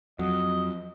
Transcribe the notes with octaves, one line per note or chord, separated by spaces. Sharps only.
F2 F#3 D#5